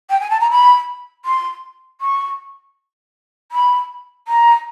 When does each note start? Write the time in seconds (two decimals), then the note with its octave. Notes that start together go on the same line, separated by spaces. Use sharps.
0.10 G5
0.20 G#5
0.30 A5
0.40 A#5
0.50 B5
1.25 C6
2.01 C#6
3.52 B5
4.28 A#5